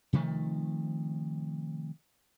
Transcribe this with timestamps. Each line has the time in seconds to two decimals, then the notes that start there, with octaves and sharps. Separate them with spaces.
0.13 C3 D#3 F3 A3